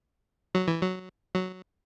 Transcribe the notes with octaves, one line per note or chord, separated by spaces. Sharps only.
F#3
E3
F#3
F#3